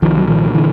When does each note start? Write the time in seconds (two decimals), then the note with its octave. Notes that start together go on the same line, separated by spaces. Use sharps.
0.02 C2 D#3 F3
0.17 F#3
0.27 A#2 D#3 F3
0.54 D3 E3